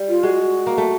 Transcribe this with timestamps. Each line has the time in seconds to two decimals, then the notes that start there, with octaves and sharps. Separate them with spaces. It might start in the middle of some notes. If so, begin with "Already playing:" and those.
Already playing: G3
0.09 F4
0.23 G#3 F#4
0.67 A#3
0.78 A3